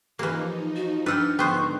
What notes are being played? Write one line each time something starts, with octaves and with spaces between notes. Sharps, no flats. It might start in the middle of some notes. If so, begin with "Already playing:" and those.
E3 F3 A#3 D#4 G4
F#4
D4 B4 F#5 G5 E6 F6
G#2 D3 D#3 B3 C5 G5 C#6 F#6